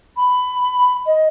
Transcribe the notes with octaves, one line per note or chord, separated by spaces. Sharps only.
B5
D#5